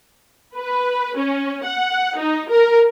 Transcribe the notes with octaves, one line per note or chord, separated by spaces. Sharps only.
B4
C#4
F#5
D#4
A#4